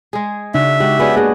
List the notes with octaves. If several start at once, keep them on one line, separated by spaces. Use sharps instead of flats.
G#3 G#4
C#3 D4 D#4 F#4 E5
G#3 F#4 G4
B3 C#4 F#4 G#4 D5
A#3 D4 G#4 D#5 F#6